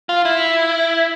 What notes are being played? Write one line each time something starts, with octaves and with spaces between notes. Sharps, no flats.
F4
E4